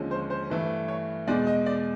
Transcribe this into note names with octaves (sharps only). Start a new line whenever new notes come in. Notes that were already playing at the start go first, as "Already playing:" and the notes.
Already playing: D#2 D3 F3 G#3 C#4
C5
C5
G2 E3 A3
C#5
E2 B2 G#3 D5
D#5
D5